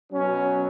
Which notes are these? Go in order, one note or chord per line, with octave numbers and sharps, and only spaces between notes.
B2 F#3 C#4